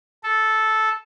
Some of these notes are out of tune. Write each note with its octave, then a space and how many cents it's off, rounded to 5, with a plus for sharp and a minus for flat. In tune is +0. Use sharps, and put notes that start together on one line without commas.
A4 -10